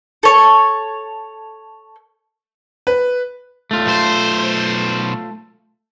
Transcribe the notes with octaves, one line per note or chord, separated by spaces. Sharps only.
A4 C#5
B4
A3 F4
B1 C5